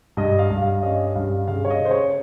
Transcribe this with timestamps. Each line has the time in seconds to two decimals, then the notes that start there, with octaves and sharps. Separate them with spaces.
0.17 G2 D#5
0.39 F5
0.50 G2
0.61 F5
0.82 C#4 D#5
1.15 G2 F5
1.47 C#3 F5
1.65 C#5
1.70 D#5
1.80 C#3
1.85 C5
1.91 C#5